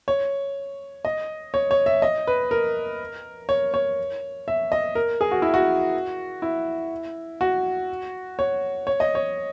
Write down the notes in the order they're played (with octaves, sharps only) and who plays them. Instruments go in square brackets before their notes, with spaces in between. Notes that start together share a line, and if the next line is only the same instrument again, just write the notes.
[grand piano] C#5
D#5
C#5
C#5
E5
D#5
B4
A#4
C#5
C#5
E5
D#5
A#4
G#4
F#4
E4
F#4
E4
F#4
C#5
C#5
D#5
C#5